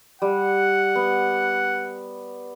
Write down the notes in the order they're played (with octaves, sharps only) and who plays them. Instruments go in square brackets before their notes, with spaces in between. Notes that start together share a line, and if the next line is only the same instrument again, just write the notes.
[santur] G3 [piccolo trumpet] F#5
[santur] B3